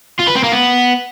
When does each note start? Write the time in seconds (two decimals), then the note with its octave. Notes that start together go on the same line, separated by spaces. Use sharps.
0.20 F4
0.28 B4
0.36 C4
0.44 A#3
0.52 B3